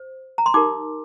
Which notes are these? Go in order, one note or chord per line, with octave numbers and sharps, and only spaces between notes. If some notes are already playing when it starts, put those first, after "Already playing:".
Already playing: C5
A#5
C6
D#4 G4 A#4 D6